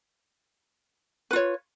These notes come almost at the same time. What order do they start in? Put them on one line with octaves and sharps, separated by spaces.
B4 F4 C#5